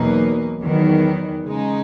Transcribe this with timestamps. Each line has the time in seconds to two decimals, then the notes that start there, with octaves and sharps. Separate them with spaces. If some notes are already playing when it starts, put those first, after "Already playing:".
Already playing: E2 B2 F#3 A#3 D#4
0.62 E2 D#3 F#3 B3
1.49 C#3 G#3 D#4